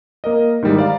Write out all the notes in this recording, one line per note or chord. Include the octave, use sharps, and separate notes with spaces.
A#3 A#4 D#5
G#2 D#3 E3 G3 G#3
C5 D5 F5 A#5